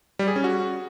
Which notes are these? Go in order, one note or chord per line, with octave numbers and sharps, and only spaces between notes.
G3
G#4
C#4
F#4